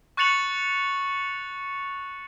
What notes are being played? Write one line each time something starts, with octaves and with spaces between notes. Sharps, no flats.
C#6 F#6 A6 C#7 F7 F#7